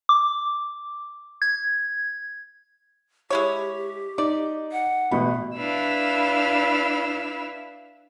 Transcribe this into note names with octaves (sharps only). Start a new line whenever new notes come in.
D6
G#6
G#3 E4 G4 C#5
D#4 D5
F#5
A1 B2 B5
D4 E4 B4 F5 E6